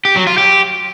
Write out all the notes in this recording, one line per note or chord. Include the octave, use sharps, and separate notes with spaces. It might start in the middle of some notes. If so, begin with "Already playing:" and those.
G4
F#3
F4
G4